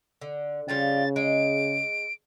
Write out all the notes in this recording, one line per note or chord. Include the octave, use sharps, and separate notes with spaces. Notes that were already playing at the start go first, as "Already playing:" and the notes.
D3
C#3 F3 G3 F4 A6
G#3 D7